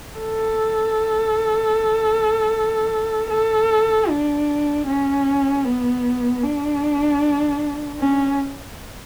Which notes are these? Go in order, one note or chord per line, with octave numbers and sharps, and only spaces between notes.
A4
A4
D4
C#4
B3
D4
C#4